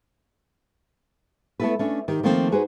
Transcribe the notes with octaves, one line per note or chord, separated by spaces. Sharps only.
A3 B3 D4 E4 A4 B4
A3 C#4 D4
D#3 G4
D#3 F3 A3 A#3 C4 D#4
D#4 F#4 G#4 B4 C5